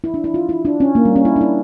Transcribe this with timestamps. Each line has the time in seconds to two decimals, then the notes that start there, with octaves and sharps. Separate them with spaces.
0.04 E4
0.14 D4
0.24 E4
0.34 F4
0.49 E4
0.65 D4
0.80 C#4
0.95 A#3
1.05 G3
1.16 C#4
1.25 E4
1.36 D4
1.41 E4